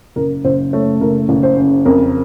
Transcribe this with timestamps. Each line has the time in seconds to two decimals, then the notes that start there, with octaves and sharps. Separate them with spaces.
0.16 F#1 A#4
0.44 F#1 C5
0.73 A3 C#5
1.01 F#1 A#4
1.29 F#1
1.43 C5
1.57 C#3
1.85 F2 A#4